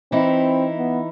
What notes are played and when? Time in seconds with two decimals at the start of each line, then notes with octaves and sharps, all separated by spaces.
0.12 E3 C4 D#4 E4
0.78 B3